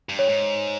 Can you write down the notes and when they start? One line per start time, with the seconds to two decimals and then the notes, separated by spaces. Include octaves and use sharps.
0.09 G2
0.19 C#5
0.29 G#2